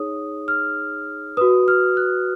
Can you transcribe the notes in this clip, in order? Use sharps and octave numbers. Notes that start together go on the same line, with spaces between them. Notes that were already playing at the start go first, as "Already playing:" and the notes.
Already playing: D#4 G#4 C#5 D#6
F6
F#4 B4 D#6
F6
F#6